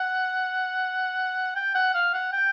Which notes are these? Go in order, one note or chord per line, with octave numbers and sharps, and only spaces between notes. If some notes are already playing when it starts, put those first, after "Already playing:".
Already playing: F#5
G5
F#5
F5
F#5
G5